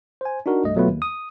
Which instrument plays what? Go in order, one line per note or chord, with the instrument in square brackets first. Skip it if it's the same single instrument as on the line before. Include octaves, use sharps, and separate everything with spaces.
[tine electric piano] C5 G#5
D4 D#4 F#4 A#4
C2 G2 A3 D#5
B2 F#3 A3 B3 F4 B4
D#2
D#6